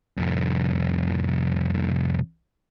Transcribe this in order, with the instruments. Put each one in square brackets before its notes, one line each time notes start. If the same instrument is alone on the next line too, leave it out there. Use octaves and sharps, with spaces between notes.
[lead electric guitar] C2 F2